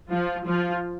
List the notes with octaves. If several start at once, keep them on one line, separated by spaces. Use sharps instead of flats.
F3 F4
F3 F4